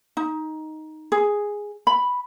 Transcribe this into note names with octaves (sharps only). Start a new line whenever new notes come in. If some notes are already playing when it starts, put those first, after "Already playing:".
D#4
G#4
B5